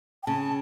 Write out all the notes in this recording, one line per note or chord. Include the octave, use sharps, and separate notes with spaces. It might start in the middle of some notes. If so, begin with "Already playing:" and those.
G5
C#3 A5